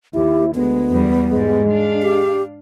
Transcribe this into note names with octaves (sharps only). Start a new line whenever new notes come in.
D#2 E4 G4
D2 G#3 B3
E2 G3
G#2 G3 G#3
D4 F5
G4